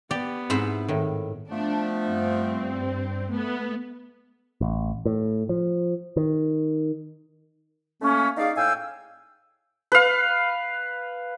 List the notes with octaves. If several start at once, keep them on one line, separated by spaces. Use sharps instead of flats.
B3 G4 D5
G#2 C4 E4 C5
A2 D#3
F3 A3 B3 D4
G2 C4
A3 B3
A1
A2
F3
D#3
A3 A#3 C#4
D#4 G#4 D5 F5
A2 F5 G5 G#5 E6
B4 F5